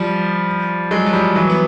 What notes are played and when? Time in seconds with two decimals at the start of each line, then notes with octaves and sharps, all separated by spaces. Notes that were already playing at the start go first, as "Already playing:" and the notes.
Already playing: F3 G3
0.91 F#3 G#3
1.06 F#3
1.13 F3 G3
1.36 E3 F#3
1.50 B3